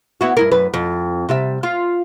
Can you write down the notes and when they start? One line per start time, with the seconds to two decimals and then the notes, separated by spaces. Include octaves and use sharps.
0.21 B3 E4 F#4
0.37 G2 E4 A#4
0.51 F#2 B4
0.74 F2
1.29 C3 G3 E5
1.63 F4